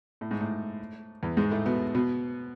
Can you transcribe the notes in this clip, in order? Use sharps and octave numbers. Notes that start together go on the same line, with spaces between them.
A2
G#2
A2
E2 E3
G#2 G#3
A2 A3
B2 B3
B2 B3